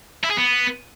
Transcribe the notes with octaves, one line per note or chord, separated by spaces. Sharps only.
E4
G#4
B3